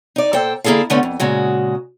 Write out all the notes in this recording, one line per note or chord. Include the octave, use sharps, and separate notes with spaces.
D#4 D5
A#2 A4 C5 G5
D3 A#3 E4 G#4 A4 F5
D2 D3 A3 B3 C#4
F2
A#2 C#3 G#3 F#4